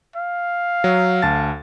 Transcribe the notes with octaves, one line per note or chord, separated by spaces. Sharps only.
F5
F#3
D2 A5 A6